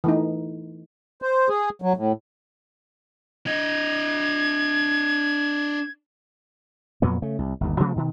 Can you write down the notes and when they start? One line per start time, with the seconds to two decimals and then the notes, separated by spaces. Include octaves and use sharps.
0.04 E3 A3 D#4
1.22 C5
1.49 G#4
1.82 F#3
1.97 A2
3.46 D4 D#5 G#6
7.02 F2 A#2 F#3 B3
7.22 C#3 A3
7.39 C2
7.61 G1 D#2
7.80 C3 F3 A3 B3
7.96 B2 D#3